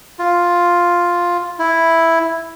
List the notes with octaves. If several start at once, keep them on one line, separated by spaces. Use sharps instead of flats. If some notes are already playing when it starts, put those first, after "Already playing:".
F4
E4